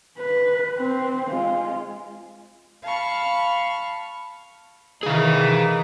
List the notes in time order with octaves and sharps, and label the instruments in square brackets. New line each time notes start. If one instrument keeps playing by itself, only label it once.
[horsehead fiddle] B4
C4
G#3 F4
[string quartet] F5 A5 B5 C#6 F6
[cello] D#3 E3 [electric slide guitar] G#4 F5